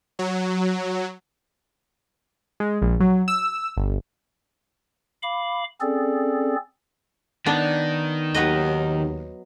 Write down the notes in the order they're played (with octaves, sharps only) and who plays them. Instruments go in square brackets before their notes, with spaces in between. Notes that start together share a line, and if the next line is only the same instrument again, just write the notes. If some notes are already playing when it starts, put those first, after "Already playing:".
[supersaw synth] F#3
[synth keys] G#3
A#1
F#3
E6
G1
[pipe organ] F5 B5 D6
C4 C#4 G#4 A4 D5
[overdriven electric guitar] D#3 [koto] B3 D4
[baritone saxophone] D#2 [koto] F#3 B4 D#5